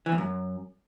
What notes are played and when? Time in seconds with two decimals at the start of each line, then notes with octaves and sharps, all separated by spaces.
0.06 E3
0.12 E2
0.18 F#2